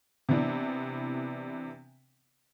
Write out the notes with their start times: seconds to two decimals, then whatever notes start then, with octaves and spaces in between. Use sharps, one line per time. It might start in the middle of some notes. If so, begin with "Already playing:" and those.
0.29 C3 E3 B3 D4